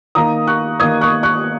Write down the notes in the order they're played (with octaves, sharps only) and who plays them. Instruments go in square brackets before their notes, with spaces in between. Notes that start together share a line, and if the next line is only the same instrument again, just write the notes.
[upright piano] D#3 A#3 D#4 A#5 D#6
C#6 F#6
D#3 A#3 D#4 D#6 G#6
C#6 F#6
C#6 F#6